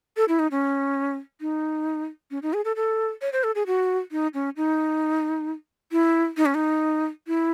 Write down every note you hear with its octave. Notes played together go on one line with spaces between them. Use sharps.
A4
E4
D#4
C#4
D#4
C#4
D#4
G#4
A4
A4
C#5
C5
A4
G#4
F#4
D#4
C#4
D#4
E4
D#4
C#4
D#4
E4